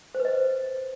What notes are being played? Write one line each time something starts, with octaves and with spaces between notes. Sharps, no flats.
C5
B4
D#5